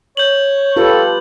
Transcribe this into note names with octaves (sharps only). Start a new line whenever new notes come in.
C#5 G6 F#7
F4 G4 A4 B4